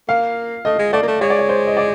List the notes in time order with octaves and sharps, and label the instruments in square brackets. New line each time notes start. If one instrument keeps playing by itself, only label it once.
[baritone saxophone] A#3 [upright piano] F5
[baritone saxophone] A3 [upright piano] D#5
[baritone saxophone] G#3
[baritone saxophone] A3 [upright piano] D5
[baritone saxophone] A#3
A3
[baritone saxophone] G#3 [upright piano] C#5
[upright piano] D5
C#5
C5
D#5
D5